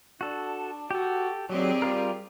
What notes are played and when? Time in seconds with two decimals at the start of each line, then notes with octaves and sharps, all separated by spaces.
0.21 D4 F#4 A4
0.91 F#4 G4 A4
1.49 D#2 F#3 C4 G4 G#4 D5
1.82 G3 F4 A#4